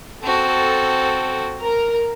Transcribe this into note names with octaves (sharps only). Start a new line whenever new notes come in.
C4 F#4 A4
A#4